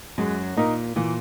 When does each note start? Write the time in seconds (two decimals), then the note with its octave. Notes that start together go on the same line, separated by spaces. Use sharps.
0.18 F#2 F#3 G#3
0.56 A#2 A#3 D#4 A#4
0.96 A#2 E3 A#3